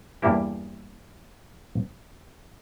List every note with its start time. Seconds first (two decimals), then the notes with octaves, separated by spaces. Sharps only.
0.22 E2 G2 G3 A#3 E4 G4